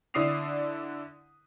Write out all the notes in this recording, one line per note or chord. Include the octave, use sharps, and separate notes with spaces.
D3 D4 E4 D#6 C7 F7